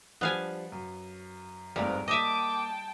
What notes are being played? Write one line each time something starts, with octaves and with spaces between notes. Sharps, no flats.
F3 G3 B3 D4 F5 G#5
F#2
G1 F2 G#2 G3 A#4 F5
A#3 D#5 E5 G5 A5 D6 D#7